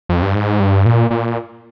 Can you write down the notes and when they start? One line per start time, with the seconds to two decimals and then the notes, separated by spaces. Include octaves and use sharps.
0.09 F2
0.22 G2
0.35 G#2
0.60 G2
0.86 A#2
1.11 A#2